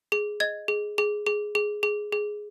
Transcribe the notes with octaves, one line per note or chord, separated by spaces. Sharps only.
G#4
D#5 G#6
G#4
G#4
G#4
G#4
G#4
G#4